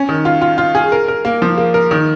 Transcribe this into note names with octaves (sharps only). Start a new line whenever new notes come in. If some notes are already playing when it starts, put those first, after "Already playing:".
Already playing: C#4
D#3
F4
F4
F4
G#4
A#4
A#4
A#3
F3
A#3
A#4
D#3